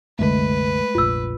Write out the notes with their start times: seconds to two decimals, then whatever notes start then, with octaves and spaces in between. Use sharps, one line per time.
0.19 C2 F#2 D3 G#3 A3 B4
0.95 F1 A#1 F4 E6